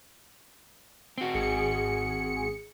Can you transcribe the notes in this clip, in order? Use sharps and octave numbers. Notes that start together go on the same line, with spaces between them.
C4 F#4
G#1 G#4 C#7